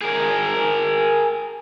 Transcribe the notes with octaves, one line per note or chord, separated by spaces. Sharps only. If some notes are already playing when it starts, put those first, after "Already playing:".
G#4 A#4